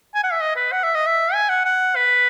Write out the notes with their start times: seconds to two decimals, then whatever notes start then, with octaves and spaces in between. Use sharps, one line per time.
0.15 G#5
0.23 F#5
0.32 E5
0.41 D#5
0.56 B4
0.72 F#5
0.83 E5
0.95 D#5
1.06 E5
1.34 G#5
1.49 F#5
1.65 F#5
1.96 B4